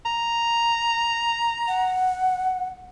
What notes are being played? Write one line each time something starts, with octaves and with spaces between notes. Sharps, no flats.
A#5
F#5